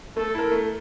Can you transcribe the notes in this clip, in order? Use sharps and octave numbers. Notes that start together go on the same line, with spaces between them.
A3 A4
E4 A#4
A3